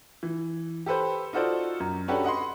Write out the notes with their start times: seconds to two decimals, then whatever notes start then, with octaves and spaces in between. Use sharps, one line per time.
0.23 E3
0.86 G4 A4 B4 C5
1.33 D#4 F4 F#4 A4 C5 D5
1.80 F#2
2.08 C#4 D4 F#4 G4 A4 B4
2.24 D#5 F#5 B5 C6